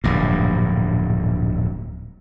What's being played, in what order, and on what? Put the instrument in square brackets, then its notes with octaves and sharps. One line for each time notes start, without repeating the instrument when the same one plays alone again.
[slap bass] D1 A#1 G2